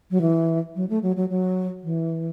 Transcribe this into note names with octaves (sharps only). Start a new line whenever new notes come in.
F#3
E3
F#3
A3
F#3
F#3
F#3
E3